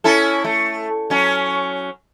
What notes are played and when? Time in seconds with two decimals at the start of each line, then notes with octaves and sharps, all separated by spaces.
0.04 C#4 E4 A4
0.44 A3
1.10 F#3 C#4